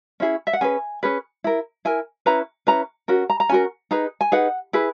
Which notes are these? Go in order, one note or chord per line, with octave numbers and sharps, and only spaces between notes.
C#4 E4 G#4
E5
F#5
C#4 G#4 B4 G#5
C#4 G#4 B4
E4 A#4
E4 A#4 G#5
C#4 E4 B4 A#5
C#4 E4 B4 A#5
C#4 F#4 A#4
A#5
A#5
C#4 F#4 A#4 G#5
D#4 G#4 B4 A#5
G#5
D#4 G#4 B4 F#5
E4 G#4 B4